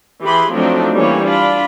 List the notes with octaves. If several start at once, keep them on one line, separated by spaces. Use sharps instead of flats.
E3 G4 G#4 B5 C6
F3 F#3 A3 C4 D4 D#4
E3 G3 A#3 C#4 C#5
D4 F4 B5